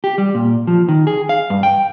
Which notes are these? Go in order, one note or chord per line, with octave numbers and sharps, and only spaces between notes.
G4
G3
A#2
F3
D#3
G#4
F5
G2
G5